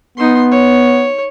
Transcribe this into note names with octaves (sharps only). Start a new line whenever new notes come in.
B3 D#4 C6
C#5